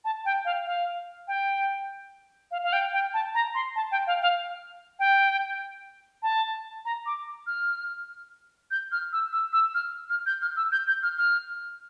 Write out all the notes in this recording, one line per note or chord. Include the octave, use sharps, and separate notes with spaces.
A5
G5
F5
F5
G5
F5
F5
G5
G5
A5
A#5
C6
A5
G5
F5
F5
G5
A5
A#5
D6
F6
G6
F6
E6
E6
E6
F6
F6
G6
F6
E6
G6
G6
F6
F6